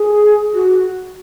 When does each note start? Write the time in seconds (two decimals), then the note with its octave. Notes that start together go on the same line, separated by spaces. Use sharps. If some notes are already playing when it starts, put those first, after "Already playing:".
Already playing: G#4
0.54 F#4